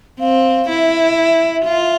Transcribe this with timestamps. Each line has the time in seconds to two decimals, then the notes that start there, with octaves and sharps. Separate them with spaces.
0.20 C4 F5
0.69 E4 E5
1.17 E5
1.65 F4